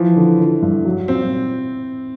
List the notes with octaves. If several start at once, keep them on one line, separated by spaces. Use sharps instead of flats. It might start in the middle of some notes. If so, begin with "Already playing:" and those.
Already playing: E3 F3
D3
D3
G2
F#3
A#2 C4